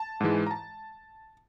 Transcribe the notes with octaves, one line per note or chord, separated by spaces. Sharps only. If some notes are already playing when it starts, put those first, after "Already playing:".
Already playing: A5
G#2 E3 G#3
A#5
A5